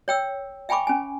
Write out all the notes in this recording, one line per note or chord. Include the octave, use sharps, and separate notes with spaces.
C#5 G5 E6
E5 G5 G#5 B5 C#6 D6
C#4 G#5